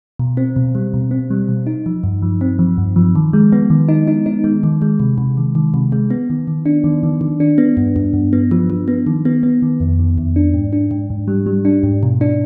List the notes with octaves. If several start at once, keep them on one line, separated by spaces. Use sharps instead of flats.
B2
C4
B2
G3
B2
C4
G3
B2
D#4
F3
G2
F3
C4
F3
G2
F3
D#3
G#3
B3
D#3
D#4
D#4
D#4
G#3
D#3
G#3
C3
C3
D#3
D#3
C3
G#3
B3
D#3
D#3
D4
D#3
D#3
D#3
D4
B3
G2
G2
G2
B3
F3
F3
B3
D#3
B3
B3
D#3
F2
D#3
F2
D4
G#2
D4
G#2
G#2
G3
G3
D4
G#2
B2
D4